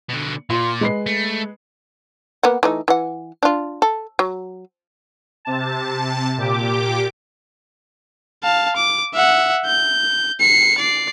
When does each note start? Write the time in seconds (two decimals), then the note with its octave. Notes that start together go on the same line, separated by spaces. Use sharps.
0.09 B2 D3
0.50 A#2 F4 C6
0.81 G#3 B4 C7
1.06 A3
2.43 A#3 B3 F#5
2.63 E3 A3 D#4
2.88 E3 F#5
3.43 D4 F4
3.82 A4
4.19 F#3
5.45 C3 A5
6.38 A#2 G4 D6
8.43 F5 A5
8.76 D6
9.14 E5 F#5
9.65 G6
10.40 C7 C#7
10.78 D5 C7